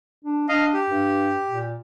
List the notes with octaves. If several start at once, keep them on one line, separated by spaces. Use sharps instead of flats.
D4
D4 D#5 F5
G4
G2
A#2